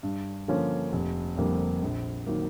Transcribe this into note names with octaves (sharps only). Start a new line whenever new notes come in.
G2
D3 F3 A#3 C#4
F1
F2 D3 G3 A#3
A#1
D#3 F#3 A#3